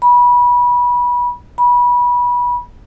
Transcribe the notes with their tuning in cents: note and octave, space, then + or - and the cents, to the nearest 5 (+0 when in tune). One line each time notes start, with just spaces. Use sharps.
B5 -25
B5 -25